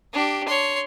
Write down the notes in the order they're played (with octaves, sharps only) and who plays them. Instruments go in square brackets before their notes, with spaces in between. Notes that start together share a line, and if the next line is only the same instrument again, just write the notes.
[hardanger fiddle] D4 G4
C#5 C6